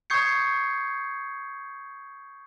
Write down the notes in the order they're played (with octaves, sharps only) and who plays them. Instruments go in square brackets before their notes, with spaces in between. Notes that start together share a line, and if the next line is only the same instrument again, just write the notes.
[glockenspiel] C#6 D#6 G6 G#6 C7 C#7